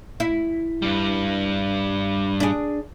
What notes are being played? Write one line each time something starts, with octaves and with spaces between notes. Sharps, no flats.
E4
G2 G3
D4 G#4